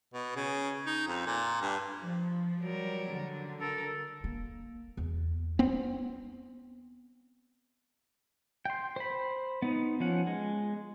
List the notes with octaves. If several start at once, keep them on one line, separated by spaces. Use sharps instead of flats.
B2
C#3
D#4
F2
A#2
G2
F3
F#3 G3 A#4
D3
A4 A#4
A#3
E2
B3 C4
G5 C6
C5 B5
B3 D#4
F3 C#4 F#5
G#3